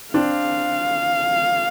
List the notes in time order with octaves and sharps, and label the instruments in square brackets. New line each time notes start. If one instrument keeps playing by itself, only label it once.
[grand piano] C4 D4 [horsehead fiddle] F5